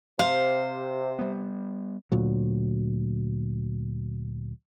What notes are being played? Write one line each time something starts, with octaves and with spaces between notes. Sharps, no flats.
C3 C5 F5
G3 B3
D2 A#2 F#3